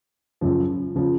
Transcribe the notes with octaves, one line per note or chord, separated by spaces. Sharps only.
F#2 C#3 F3
C#3 F3